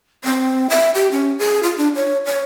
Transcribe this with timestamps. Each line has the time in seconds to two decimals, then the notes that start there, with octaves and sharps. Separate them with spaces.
0.24 C4
0.70 E5
0.95 G4
1.11 C#4
1.39 G#4
1.63 F4
1.78 D4
1.96 C#5
2.26 C#5